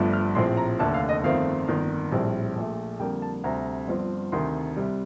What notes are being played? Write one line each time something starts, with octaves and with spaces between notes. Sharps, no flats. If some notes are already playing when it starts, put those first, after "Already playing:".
Already playing: G1 G2 F3 A3
F6
A#1 A2 F3 C4 C6
A#5
F1 D#2 D3 A3 A5
F5
D#5
G1 F2 D#3 A3 C4 F5
G1 F2 D#3 A#3
A#1 A2 G3 C4
A#1 A#2 A3
F2 D3 G3 A#3 G5
A5
D2 C3 G3 C4 A#5
G1 G2 F3 C4
D2 C3 D#3 C6
C2 C3 G3